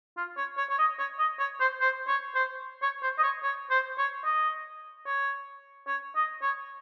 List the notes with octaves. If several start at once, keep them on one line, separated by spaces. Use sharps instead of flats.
F4
C#5
C#5
C#5
D#5
C#5
D#5
C#5
C5
C5
C#5
C5
C#5
C5
D#5
C#5
C#5
C5
C#5
D#5
C#5
C#5
D#5
C#5